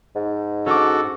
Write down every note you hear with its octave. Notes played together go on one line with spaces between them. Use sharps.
G#2
C#4 F#4 A4 D6